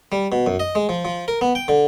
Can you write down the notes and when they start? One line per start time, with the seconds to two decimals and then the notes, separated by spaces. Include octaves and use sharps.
0.12 G3
0.32 B2
0.47 F#2
0.60 D#5
0.75 G#3
0.89 F3
1.05 F3
1.28 A#4
1.41 B3
1.55 G5
1.68 D3